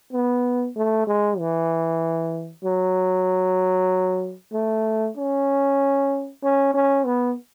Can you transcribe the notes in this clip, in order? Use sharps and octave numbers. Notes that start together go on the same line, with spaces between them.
B3
A3
G#3
E3
F#3
A3
C#4
C#4
C#4
B3